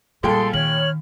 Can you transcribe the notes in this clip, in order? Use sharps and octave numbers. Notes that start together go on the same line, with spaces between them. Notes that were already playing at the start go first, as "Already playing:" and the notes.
A#1 G3 G#3 A4 G5 C6
D#3 C#5 F6 F#7